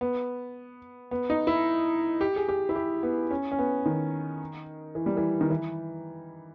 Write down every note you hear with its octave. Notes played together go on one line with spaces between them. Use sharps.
B3
B3
D#4
E4
G4
G#4
G4
E4
G4
B3
C#4
C#4
B3
D#3
E3
G3
E3
D#3
E3